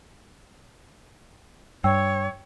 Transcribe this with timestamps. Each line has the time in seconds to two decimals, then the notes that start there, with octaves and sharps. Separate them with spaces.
1.84 G2 C#5 G5 E6